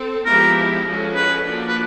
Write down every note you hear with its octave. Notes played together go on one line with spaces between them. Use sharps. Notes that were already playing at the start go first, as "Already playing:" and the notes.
Already playing: C4 A4
F3 G#3 B3 E4 G4 A#4
F3 G#3 C#4 F#4 A4
B4
F3 A#3 D4 F#4
B4